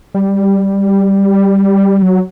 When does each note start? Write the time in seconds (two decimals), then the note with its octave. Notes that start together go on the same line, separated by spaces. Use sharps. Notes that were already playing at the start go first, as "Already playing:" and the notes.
0.15 G3
2.02 F#3